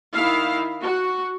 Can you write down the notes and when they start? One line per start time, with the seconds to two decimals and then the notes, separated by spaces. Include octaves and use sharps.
0.15 D#3 E4 F5
0.82 F#4